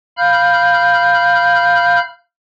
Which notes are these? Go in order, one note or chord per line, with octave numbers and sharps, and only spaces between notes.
F5 B5 F6 G6